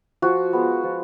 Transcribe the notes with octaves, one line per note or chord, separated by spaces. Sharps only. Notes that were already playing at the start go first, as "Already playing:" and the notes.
F3 F#4
G#3 B3
F3